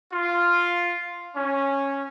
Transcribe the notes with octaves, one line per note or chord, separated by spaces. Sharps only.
F4
C#4